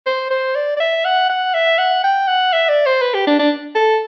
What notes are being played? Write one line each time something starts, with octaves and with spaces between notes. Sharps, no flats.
C5
C5
D5
D5
E5
F#5
F#5
E5
F#5
G5
F#5
E5
D5
C5
B4
G4
D4
D4
A4